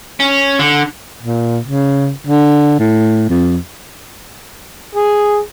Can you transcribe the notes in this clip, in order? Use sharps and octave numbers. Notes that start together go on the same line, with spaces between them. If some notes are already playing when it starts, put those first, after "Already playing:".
C#4
D3
A#2
C#3
D3
A2
F2
G#4